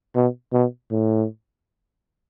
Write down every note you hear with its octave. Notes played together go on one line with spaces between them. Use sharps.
B2
B2
A2